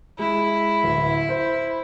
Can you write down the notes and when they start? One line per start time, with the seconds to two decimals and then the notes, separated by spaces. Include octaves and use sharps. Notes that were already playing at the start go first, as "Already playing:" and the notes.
0.19 G#3 E4
0.83 D1
1.29 C5